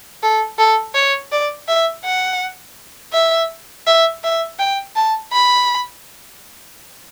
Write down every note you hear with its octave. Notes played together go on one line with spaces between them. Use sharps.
A4
A4
C#5
D5
E5
F#5
E5
E5
E5
G5
A5
B5